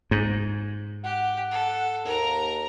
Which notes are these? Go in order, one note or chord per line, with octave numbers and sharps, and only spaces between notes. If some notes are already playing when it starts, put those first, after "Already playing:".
G#2
G4 F#5
A4
D#2 A#4 A#5